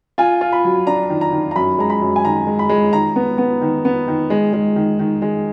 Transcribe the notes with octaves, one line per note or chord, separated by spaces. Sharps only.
F4 G#5
F4
B5
F#3
D4 A#5
D#3
A#5
D#3
A#5
F#2 B5
G#3 A#5
B5
F#2
G#5
D#3 A#5
G#3
B5
G#3
D#3 A#5
B3
B3
D#3
B3
D#3
G#3
G#3
D#3
D#3
G#3